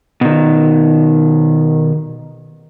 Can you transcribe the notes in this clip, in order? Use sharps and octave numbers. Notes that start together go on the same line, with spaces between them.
B2 D#3